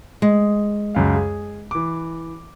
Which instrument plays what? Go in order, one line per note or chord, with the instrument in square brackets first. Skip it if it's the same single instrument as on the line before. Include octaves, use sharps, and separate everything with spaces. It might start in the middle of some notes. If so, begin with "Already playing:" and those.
[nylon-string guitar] G#3
[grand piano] C#2 F#2 F5
G#4
E3 D6